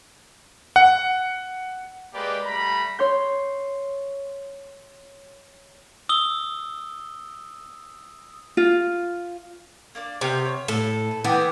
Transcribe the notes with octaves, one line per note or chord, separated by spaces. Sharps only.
F#5
G#3 A#3 G4 B4 D5 G5
G3 A3 A#5 B5
C#5 C6 G6
D#6 E6 G7
F4
A#3 D4 D5
C3 B3 G4 F6
C#5
A2 A4
B4
E3 B3 G5 D6